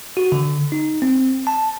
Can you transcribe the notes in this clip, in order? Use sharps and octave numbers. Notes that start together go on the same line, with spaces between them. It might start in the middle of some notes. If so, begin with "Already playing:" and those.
F#4
D3
D#4
C4
A5